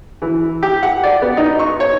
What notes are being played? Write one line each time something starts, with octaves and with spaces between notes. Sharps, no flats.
E3
G4
F#5
D5
B3
D#4
C#6
C#5